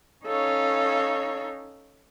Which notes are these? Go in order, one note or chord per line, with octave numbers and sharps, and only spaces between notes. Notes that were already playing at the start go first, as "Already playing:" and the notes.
C#4 D#4 A4 C#5 F5